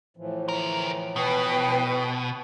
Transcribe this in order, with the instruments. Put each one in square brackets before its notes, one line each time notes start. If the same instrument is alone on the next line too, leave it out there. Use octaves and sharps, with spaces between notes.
[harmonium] A2 E3 F3
[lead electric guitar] D2 A#4
[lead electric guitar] B2 [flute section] B4 G5